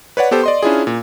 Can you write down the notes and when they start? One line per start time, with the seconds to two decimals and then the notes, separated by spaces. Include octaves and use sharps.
0.17 B4 C#5 D5 F#5
0.31 B3 G4 A4 C5
0.43 D5 D#5 C6
0.63 C#4 D4 E4 F4 G#4
0.87 A#2